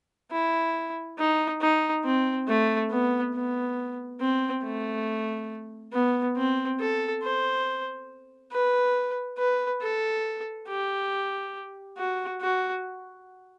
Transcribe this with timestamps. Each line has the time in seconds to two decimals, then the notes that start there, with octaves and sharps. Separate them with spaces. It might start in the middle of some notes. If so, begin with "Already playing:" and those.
0.32 E4
1.19 D#4
1.61 D#4
2.05 C4
2.48 A3
2.91 B3
3.35 B3
4.21 C4
4.64 A3
5.93 B3
6.37 C4
6.80 A4
7.23 C5
8.52 B4
9.38 B4
9.82 A4
10.68 G4
11.98 F#4
12.41 F#4